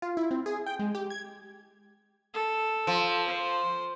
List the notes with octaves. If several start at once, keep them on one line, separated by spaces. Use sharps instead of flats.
F4
E4
C4
G#4
G5
G#3
G4
G#6
A4
F3
C5